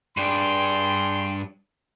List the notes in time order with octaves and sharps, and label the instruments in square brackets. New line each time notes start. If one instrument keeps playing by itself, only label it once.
[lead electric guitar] G2 D4 [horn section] G#4 G5 C6